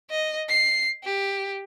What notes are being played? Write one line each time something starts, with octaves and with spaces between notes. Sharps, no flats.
D#5
C7
G4